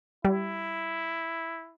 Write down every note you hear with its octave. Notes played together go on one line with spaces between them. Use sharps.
G3 E4